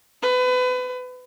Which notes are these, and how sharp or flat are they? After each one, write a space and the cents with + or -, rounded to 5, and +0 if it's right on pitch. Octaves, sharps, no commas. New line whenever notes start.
B4 +30